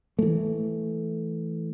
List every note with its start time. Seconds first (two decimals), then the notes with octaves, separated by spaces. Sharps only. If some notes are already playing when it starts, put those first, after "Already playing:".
0.19 E3 A3